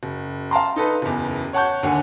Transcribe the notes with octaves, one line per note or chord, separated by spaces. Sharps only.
F#1
F5 A5 A#5 C6
D#4 A4 B4
F#1 E2
C#5 F#5 A5 C#6 G6
D#2 D3 F#5 G#5